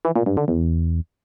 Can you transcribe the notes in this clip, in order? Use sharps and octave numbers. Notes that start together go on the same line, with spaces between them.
E3
A#2
G2
D3
E2